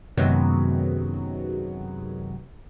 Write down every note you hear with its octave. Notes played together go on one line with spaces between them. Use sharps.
F#2 C3 D#3 F#3 G#3 B3